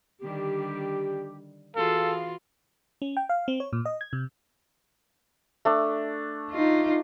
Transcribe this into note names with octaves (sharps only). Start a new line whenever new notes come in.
D3 D#3 G3 G4
E3 F4 F#4 G#4 A4 F5
C#4
G5
F5
C4
C#5
A#2
D#5
G#6
C3
A3 D4
D#4 F4